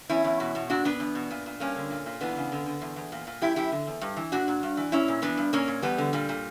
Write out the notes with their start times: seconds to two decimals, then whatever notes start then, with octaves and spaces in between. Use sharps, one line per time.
0.09 E2 C#4 E4
0.24 E2
0.40 B2
0.55 B2
0.70 A#2 D4 F#4
0.85 A#2 B3 D4
1.00 E2
1.15 B2
1.31 A#2
1.46 A#2
1.60 G2 A#3 C#4
1.76 D3
1.91 A#2
2.06 A#2
2.21 E3 B3 D4
2.37 C#3
2.52 D3
2.66 D3
2.82 E2
2.96 E2
3.12 A#2
3.27 A#2
3.42 F#2 E4 G4
3.56 F#2 E4 G4
3.72 D3
3.87 E2
4.01 G2
4.17 E3
4.32 A#2 D4 F#4
4.48 A#2
4.63 G2
4.77 E3
4.92 A#2 C#4 E4
5.08 A#2
5.22 E3 B3 D4
5.38 G2
5.53 A#2 A#3 C#4
5.68 A#2
5.82 E2 G3 B3
5.98 D3
6.13 A#2 G3
6.29 A#2